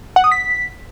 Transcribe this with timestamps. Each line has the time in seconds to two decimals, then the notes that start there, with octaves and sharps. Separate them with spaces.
0.16 F#5
0.24 D#6
0.32 B6